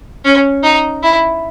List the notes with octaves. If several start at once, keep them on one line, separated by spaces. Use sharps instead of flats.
C#4
D#4
E4